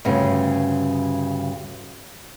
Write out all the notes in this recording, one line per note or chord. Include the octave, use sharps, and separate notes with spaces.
D2 G2 C#3